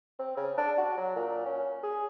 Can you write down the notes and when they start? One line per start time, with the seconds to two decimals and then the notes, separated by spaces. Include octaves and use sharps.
0.19 C4
0.37 C#3
0.57 D4
0.78 F#4
0.98 F#3
1.16 A#2
1.46 C#4
1.83 G#4